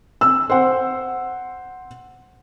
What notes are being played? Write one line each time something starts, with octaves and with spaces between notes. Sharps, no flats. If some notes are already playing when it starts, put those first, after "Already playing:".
E6
C5 F#5